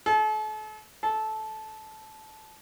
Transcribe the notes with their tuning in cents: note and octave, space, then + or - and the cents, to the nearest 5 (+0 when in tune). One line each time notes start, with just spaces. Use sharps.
A4 -40
A4 -15